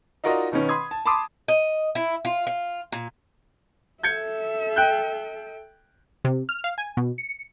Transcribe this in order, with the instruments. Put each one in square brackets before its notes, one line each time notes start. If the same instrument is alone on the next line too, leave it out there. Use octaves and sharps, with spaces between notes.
[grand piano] D#4 F4 F#4 A#4 D5 D#5
B2 D#3 B3 C#4
B5 C6 D#6 G#6
A5
A5 B5 C6 D6 D#6
[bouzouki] D#5
E4
F4
F4
A#2
[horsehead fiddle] A4 E5 [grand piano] G6 G#6 C#7
[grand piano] G5 F#6 G6
[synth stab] C3
F6
F5
G#5
B2
C#7